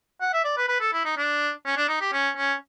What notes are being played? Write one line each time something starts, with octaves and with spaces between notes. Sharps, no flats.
F#5
E5
D5
B4
B4
A4
E4
D#4
D4
C#4
D4
D#4
G4
C#4
C#4